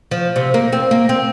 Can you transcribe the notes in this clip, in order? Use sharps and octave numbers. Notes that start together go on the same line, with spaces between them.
F3
C3
A#3
C4
A#3
C4